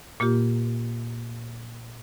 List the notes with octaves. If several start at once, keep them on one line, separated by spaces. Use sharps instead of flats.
A#2 A#3 F4 G4